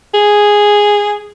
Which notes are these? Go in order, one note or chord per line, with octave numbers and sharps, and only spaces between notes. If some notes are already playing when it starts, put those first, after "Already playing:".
G#4